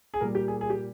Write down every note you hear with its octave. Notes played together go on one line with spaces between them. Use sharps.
G#4
A#2 G3 A#3 A#4
G4
G#4
G#4
G4